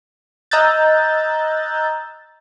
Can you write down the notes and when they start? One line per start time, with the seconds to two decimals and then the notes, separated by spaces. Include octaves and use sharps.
0.51 D#5 A#5 E6 F#6 G6 A6